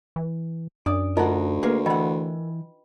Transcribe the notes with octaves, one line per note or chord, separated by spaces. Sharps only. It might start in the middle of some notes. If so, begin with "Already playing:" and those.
E3
F#2 D4 D5 D#6
D2 D#4 F4 A#4 D#5 F#5
A#3 G#4 A#4 B4
E3 D#5 F#5 G5 B5